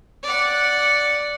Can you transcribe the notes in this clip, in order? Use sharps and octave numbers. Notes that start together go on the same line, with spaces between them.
D5 F#5